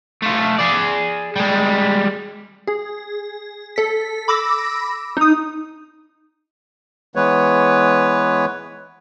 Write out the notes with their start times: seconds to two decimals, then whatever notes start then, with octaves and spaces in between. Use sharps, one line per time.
0.22 A3 F4
0.58 G#4 D5
1.36 G3 G#3
2.67 G#4
3.76 A4 B6
4.28 B5 D6 E6 A#6
5.17 D#4 D#6
7.16 E3 G#3 B3 B4 C#5